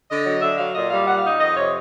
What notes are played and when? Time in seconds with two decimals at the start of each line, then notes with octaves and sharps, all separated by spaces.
0.09 D3 D#5
0.26 F#3
0.42 D3 E5
0.58 F#3 F5
0.74 A#2 D#5
0.90 G3 F5
1.07 A#2 F#5
1.18 F5
1.24 D#4
1.40 F2 D#5
1.56 C3 C#5